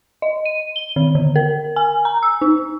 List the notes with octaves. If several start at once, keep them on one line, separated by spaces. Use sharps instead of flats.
D#5
D#7
G7
D#3
D3
A#4
G#5
A#5
E6
D#4